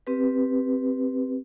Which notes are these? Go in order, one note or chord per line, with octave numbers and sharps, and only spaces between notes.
C4 G4 B4